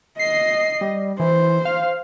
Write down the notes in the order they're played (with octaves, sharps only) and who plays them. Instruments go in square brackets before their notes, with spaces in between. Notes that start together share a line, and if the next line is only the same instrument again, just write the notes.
[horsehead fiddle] D#5 [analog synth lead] C7
[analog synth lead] G3
[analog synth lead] E3 [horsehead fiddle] C5
[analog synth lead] F5